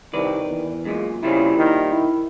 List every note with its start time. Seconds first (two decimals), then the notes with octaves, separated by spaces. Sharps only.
0.14 C2 D#3 B4 D5
0.46 E2
0.85 F#2 A#2 G#3
1.23 A#2 C#3 G3 C4 E4
1.57 D#3
1.91 E4